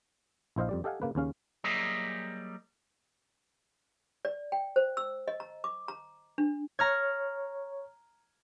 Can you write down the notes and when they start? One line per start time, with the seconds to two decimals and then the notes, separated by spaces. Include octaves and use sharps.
0.56 A#1 E4 C5 D#5 F5
0.69 F2 G3 D5
0.84 G4 A4 D#5 F5 F#5 G#5
1.02 C#3 A#3 B4
1.15 D#2 C#3 C#4 F5
1.64 F#3 G3 A#3 G#4 D#5 E5
4.25 D5
4.52 G5
4.76 C5
4.97 E6
5.28 D#5
5.40 A#5
5.64 D6
5.88 A#5
6.38 D4
6.79 C#5 A#5 F6 G#6